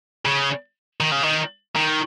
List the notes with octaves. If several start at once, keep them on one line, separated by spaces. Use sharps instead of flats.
C#3
D#3
C#3
D#3
D#3